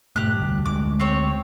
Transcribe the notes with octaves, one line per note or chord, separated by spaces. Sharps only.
G#2 B2 A3 G4 F#6
F1 D2 G3
D2 G3 G#3 D6
C4 G4 C#5